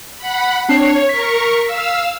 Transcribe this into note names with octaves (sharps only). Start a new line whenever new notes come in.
F#5 B5
C4 D4 C#5 C7
A#4 C#6 B6
F5 E6